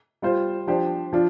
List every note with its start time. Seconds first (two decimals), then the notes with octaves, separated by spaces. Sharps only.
0.22 G3 F4 C5
0.67 F3 D4 G4 C5
1.13 F3 D4 F4